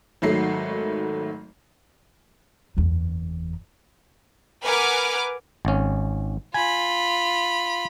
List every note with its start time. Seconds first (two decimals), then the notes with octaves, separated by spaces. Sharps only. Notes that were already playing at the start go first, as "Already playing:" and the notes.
0.22 G#1 D#3 F#3 A3 C7
2.77 F#1 E2
4.65 A#4 B4 F#5 G#5 D6 F6
5.65 G#1 C#4
6.54 F4 G#5 B5